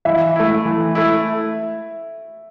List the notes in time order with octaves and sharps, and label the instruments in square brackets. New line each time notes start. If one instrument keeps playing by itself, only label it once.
[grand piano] E3 [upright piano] E5
[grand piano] A3 E4
E3
A3 E4